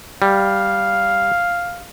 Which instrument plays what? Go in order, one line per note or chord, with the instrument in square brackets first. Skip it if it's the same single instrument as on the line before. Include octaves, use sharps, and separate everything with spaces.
[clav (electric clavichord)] G3 [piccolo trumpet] F5